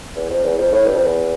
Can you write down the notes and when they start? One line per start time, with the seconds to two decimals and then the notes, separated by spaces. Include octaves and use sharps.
0.16 E2
0.30 F2
0.44 E2
0.58 F2
0.72 A2
0.86 G2
0.94 F2
1.04 E2